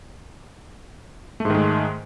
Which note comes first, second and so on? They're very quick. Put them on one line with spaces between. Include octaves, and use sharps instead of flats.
A3 G#2 D#3 G#3